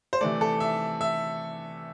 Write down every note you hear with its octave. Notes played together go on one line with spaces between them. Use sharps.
C5
C3 E3 A3 D5
A4
E5
E5